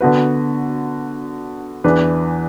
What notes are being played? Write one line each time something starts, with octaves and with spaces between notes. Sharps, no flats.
D3 B3 F#4 B4
E2 E3 D4 B4